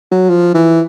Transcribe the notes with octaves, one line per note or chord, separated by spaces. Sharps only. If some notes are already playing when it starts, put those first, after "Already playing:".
F#3
F3
E3